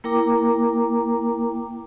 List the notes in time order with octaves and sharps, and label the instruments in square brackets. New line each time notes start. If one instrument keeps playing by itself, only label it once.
[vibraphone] A#3 E4 A#4 G5 A#5 D6